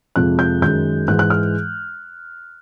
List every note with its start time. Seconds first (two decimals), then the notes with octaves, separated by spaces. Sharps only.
0.16 F2 C3 F3 G#3 F#6
0.39 G6
0.62 F#2 D#3 G#3 G6
1.08 G#2 E3 G#3 F#6
1.19 F#6
1.30 F6